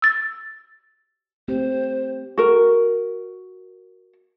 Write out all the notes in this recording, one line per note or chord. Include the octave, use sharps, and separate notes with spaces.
E6 A6
A3 C4 G4 C5
F#4 A#4